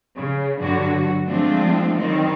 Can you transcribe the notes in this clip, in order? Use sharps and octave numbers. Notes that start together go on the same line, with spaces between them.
C#3
G2 D3 F#3 F#4
F3 G#3 A3 C4 D4 F4
D#3 F#3 G3 C4 D#4